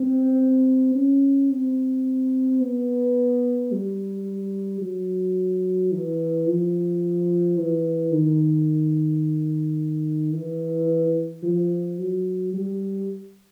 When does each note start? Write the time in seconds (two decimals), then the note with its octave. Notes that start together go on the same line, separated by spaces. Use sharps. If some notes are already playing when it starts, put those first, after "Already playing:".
Already playing: C4
0.95 C#4
1.50 C4
2.61 B3
3.72 G3
4.81 F#3
5.92 E3
6.47 F3
7.58 E3
8.12 D#3
10.33 E3
11.43 F3
11.99 F#3
12.53 G3